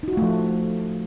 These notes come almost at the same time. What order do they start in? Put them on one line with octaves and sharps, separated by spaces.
D#4 F#4 F4 A3 F3